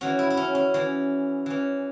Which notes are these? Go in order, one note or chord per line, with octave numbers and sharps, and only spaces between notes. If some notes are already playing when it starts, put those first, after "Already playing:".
E3 C#4 F#4
E4
E4
C#4
C#4
E3 C#4
E3 C#4